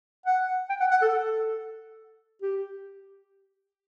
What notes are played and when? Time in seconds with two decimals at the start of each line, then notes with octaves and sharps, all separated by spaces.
0.26 F#5
0.69 G5
0.80 F#5
0.91 F#5
1.02 A4
1.12 A4
2.42 G4